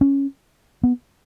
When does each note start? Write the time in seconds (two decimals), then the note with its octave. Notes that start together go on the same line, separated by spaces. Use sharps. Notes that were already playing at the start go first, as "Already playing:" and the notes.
0.01 C#4
0.83 B3